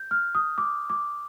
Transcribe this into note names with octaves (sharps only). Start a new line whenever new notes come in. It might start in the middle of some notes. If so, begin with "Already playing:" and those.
Already playing: G6
F6
D#6
D6
D6